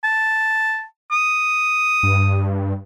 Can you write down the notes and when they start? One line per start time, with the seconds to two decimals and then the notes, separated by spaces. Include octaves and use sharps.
0.04 A5
1.12 D#6
2.03 G2